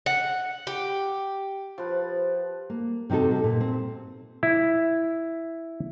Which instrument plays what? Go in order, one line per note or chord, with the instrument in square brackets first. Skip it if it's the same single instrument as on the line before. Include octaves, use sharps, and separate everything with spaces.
[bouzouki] F#5
G4
[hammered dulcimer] F3 B4
[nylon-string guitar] A#3
C3 C4 D#4 F#4 A4
C3
A#2
C4
[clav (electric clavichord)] E4